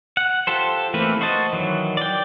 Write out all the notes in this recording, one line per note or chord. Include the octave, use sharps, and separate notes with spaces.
F#5
F4 G4 A4 C5
E3 A3 A#3 C4 B4
F#4 C5 D#5 A5
D#3 E3 F#3
D5 G5